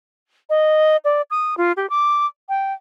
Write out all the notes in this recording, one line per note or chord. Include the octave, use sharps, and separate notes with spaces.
D#5
D5
D#6
F4
G4
D6
G5